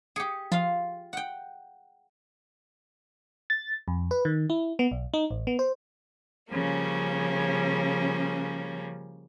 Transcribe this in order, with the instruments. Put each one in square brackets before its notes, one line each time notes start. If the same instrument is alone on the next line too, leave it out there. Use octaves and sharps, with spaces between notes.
[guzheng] G4 G#4 [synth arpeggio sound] C#7
[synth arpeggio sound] F3 [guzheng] F4 F5
[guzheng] F#5 G5
[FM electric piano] A6
F2
B4
D#3
E4
B3
B1
D#4
A1
B3
C5
[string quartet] C#3 F3 G3 A#3 C#4